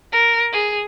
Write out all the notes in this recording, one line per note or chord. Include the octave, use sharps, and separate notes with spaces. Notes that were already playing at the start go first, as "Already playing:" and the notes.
A#4
G#4